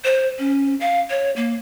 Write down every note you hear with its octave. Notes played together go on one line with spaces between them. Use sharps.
C5
C#4
F5
C#5
A#3